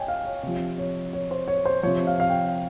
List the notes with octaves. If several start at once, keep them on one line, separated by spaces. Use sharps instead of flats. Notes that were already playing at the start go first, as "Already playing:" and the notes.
Already playing: C#5 D#5 G5 G#5
F5
C#5
C3 F3
C#5
C#5
C5
C#5
C5
C3 F3 C#5
F5
F5
G5